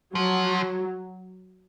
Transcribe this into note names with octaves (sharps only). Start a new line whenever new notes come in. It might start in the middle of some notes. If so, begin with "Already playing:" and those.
F3 F#3